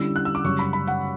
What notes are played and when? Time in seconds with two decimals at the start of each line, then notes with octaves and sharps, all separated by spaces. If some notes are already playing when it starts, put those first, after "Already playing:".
Already playing: D3 G3 C#4 E4 E6
0.16 F#6
0.25 E6
0.35 D6
0.44 F#2 C#3 G3 C#4 C#6
0.59 B5
0.73 B5
0.88 F#5